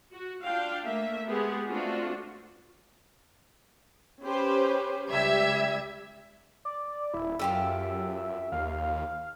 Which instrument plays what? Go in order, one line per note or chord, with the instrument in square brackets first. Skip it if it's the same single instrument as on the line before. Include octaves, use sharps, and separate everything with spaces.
[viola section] F#4
D4 F4 F5 G5
A3 A#3 E5
G#3 B3 G4 G#4
A3 C4 D4 F4 F#4
[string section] C#4 G4 B4 C5
C#2 G3 E5 G#6
[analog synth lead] D5
[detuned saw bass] D#1 [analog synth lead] E4
[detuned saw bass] F#2 [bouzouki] F4 G4 A4 [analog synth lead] E5
[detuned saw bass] D#2 [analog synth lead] F5